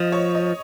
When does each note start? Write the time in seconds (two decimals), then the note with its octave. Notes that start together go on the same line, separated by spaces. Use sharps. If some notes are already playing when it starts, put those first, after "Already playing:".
Already playing: F3 D#5
0.12 C#5
0.35 D#5